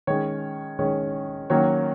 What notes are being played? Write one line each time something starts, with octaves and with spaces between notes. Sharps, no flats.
D#3 G#3 C#4 C#5
D#3 G#3 C#4
D#3 F#3 A#3 C#4 C#5